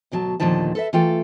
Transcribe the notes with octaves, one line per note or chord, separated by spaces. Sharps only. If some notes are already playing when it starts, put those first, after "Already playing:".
D2 B2 F#3 A5
D#2 A#2 D3 D#3 F3 A5
A4 B4 E5
E3 A3 F4 A4 G5